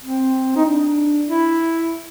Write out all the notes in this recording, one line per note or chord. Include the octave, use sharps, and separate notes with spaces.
C4
D#4
D4
E4